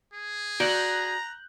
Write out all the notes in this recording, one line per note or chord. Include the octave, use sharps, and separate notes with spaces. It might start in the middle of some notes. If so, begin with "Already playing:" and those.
G#4
F#4 D5 A#5 F#6 G6